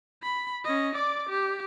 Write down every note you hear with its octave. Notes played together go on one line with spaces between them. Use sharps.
B5
C#4 D#5
D5 D6
G4